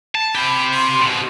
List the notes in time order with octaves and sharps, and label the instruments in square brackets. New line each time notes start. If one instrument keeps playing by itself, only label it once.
[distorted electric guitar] A5
[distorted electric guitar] C4 G4 [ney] B5
[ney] C6
[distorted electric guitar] G#2 B2